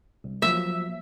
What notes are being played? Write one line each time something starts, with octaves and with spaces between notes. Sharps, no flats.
C2
F3 F#3 A#3 E5